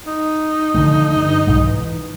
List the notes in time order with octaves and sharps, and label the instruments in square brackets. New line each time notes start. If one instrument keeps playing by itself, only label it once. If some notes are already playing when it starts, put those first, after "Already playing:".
[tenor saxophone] D#4
[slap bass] D3 F3 A3
G2
B1 G#2
E3